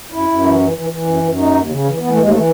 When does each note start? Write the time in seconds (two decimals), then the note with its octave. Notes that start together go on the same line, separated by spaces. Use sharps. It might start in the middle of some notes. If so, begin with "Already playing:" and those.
0.12 F#2 E4
0.28 F#2
0.43 E3
0.59 E3
0.74 E3
0.90 E3
1.05 F#2
1.22 F#2
1.37 D#2 D#4
1.53 D#2
1.68 C#3
1.84 E3
1.99 E3 B3
2.09 A3
2.16 D#2 G#3
2.29 E3 A3